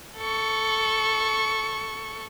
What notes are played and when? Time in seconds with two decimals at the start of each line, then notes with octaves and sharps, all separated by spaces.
0.17 A4 C#6